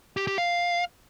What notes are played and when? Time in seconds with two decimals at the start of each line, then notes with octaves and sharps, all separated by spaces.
0.17 G4
0.27 G4
0.38 F5